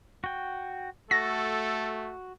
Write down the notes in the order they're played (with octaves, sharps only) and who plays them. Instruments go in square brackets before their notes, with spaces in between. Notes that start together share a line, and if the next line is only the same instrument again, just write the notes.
[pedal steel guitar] F#4 G5
[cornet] A3 [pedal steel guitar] F#4 [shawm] A4 [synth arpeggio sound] A#6